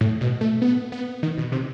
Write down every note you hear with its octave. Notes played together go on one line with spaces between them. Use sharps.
A2
B2
A3
B3
B3
D#3
B2
C3